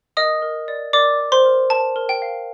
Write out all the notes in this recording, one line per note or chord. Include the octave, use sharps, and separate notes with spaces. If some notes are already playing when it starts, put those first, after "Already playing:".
A#4 D#5 D#6
A#4
D5
A#4 D5 D6
D5
C5 C6
A#4
A#4 A5
A#4
G5
F5